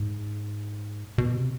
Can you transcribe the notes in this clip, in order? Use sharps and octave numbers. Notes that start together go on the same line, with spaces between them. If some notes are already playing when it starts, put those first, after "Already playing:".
Already playing: G#2
B2
C3